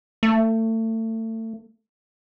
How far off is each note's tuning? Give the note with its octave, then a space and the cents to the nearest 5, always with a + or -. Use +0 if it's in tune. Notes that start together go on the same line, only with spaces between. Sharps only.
A3 +30